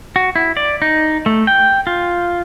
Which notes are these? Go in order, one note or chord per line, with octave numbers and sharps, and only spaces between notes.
F#4
E4
D5
D#4
A3
G5
F4